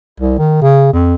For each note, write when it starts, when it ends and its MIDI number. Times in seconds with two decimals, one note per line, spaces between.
0.20 0.37 36
0.39 0.58 51
0.62 0.90 49
0.93 1.15 41